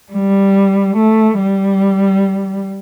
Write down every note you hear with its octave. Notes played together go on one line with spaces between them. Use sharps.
G3
A3
G3